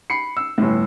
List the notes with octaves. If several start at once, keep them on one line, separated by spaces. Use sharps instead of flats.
B5 C7 C#7
E6
G1 A2